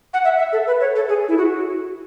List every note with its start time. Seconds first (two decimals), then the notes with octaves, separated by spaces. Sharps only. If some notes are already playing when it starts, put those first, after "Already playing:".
0.14 F#5
0.24 E5
0.39 E5
0.53 A4
0.67 B4
0.81 C#5
0.96 A4
1.09 G#4
1.28 E4
1.38 F#4